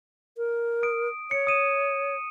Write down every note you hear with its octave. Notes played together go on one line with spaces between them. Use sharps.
A#4
D#6 D7
C#5 C#7
D#6 D#7 E7